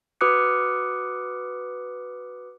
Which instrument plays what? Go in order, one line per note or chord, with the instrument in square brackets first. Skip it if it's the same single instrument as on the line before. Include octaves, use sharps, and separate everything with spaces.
[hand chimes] F#4 B4 D6 D#6 F#6 C#7